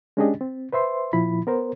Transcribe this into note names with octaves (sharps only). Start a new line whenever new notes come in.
G#3 C#4 D4 G4 G#4 D#5
C4
B4 C5 E5 C6
A#2 F3 E4 B5
B3 A#4 C5